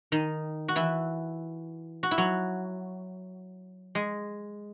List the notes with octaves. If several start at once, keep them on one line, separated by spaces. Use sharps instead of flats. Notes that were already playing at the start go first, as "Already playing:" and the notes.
D#3 D#4
F#4
E3 E4
F#4
E4
F#3 F#4
G#3 G#4